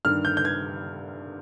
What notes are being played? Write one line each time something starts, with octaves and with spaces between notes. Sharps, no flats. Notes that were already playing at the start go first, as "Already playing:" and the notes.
G2 D#3 F6
G6
G6
G#6